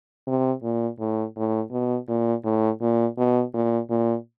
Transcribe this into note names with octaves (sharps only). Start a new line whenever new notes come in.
C3
A#2
A2
A2
B2
A#2
A2
A#2
B2
A#2
A#2